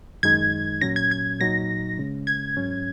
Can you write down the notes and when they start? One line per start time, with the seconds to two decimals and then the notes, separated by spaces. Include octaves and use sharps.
0.23 F#2 D#3 G#3 D#4 G#6
0.81 A#2 F#3 C#4 A#6
0.96 G#6
1.11 G#6
1.40 A#2 F#3 D#4 A#6
1.98 C#3 G#3 C#4
2.27 G#6
2.57 G#2 F#3 C#4